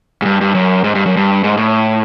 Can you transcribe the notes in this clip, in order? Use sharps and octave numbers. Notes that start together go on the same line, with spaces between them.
G#2
G2
G2
F#2
G#2
G2
F#2
G2
G#2
A2